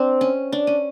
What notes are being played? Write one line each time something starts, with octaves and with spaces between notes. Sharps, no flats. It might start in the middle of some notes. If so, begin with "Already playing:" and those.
Already playing: C4 D4
C#4
D4
C#4